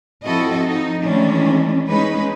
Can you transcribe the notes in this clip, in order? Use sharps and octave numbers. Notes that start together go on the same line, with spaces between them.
F3 C4 E4 F#4 A4 D#5
F3 D#4
D#3 E3 G#3 A3 C#4 D4
G#3 B3 C#4 D#4 G#4 B4